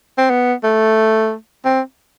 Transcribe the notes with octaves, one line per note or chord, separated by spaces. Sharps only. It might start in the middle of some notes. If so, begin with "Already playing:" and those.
C4
B3
A3
C4